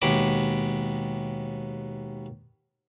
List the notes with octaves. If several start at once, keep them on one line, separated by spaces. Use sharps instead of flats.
D#2 B2 G#3 B5 D6